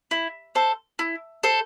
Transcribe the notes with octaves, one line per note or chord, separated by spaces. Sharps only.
E4
A4 C5
E4
A4 C5